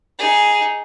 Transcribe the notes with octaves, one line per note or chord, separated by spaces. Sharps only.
D#4 G#4